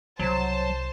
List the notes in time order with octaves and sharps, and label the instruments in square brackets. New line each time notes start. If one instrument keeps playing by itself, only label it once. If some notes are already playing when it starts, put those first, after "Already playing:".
[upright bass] C2 B2 [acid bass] F#3 [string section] C5 A5